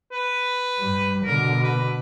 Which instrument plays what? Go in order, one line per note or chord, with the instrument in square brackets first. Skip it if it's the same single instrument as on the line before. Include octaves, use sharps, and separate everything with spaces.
[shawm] B4
[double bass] G2 G3
[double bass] B2 D3 [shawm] A#4
[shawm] B4